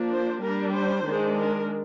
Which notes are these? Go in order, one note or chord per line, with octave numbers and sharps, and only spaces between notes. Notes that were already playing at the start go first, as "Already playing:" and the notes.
Already playing: F3 A#3 D4
C5
G3 D4 A#4
C5
D#3 G#3 D4
A#4